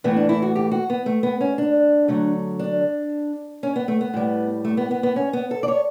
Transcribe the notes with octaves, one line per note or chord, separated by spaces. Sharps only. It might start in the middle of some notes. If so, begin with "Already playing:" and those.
A2 E3 A3 B3
D4
E4
F#4
G4
F#4
B3
A3
B3
C#4
D4
D3 F#3 A3
D4
C#4
B3
A3
B3
A2 G3
A3
B3
B3
B3
C#4
B3
A4
D5
C#5